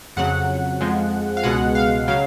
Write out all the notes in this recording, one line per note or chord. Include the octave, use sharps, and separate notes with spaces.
F2 C#3 F#3 F#5
F2 F3 G#3
F5
C#2 B2 G#3 F#5
F5
C#3 F#3 F5